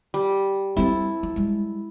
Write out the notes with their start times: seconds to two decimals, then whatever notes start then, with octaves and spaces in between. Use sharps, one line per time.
0.14 G3
0.77 G3 C4 E4 A4
1.23 F3
1.36 G3 G#3